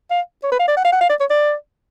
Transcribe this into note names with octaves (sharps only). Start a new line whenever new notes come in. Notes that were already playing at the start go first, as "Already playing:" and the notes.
F5
C#5
B4
F5
D5
F#5
F5
F#5
F5
D5
C#5
D5